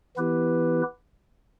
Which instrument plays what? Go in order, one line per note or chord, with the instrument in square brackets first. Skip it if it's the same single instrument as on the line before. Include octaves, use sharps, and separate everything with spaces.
[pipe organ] E3 B3 E4 G4 B4